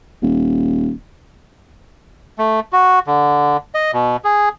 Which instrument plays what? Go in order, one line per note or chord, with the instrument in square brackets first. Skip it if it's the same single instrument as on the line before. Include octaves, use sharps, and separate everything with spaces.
[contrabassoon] D#1
[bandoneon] A3
F#4
D3
D#5
B2
G#4